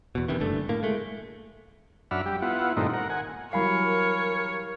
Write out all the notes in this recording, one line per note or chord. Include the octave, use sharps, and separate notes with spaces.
E2 B2
E2 C3 D#3 E3
F#1 G2 D3 A3
A2 A#3
G#3 A3
F#2 D4 E5 F#5 B5 F6
G3 G4
B3 E4 F4 F#5
G2 A#2 D#3 A3 C4 D#4
A#4 F#5
F#5 G#5
E3 F#3 G3 A#4 C#5 F5 G#5 B5